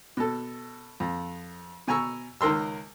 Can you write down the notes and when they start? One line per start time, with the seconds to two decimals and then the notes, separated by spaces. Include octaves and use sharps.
0.17 B2 A4
1.00 F2
1.88 B2 G#5 A#5 C#6 E6
2.41 C#2 D#3 A#4 C6 E6